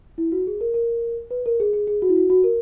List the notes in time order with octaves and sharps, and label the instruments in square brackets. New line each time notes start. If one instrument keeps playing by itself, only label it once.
[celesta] E4
F#4
G#4
A#4
A#4
B4
A#4
G#4
G#4
G#4
F#4
E4
F#4
F#4
A#4